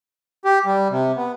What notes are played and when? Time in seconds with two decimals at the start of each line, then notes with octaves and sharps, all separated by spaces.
0.45 G4
0.65 G3
0.90 C3
1.17 B3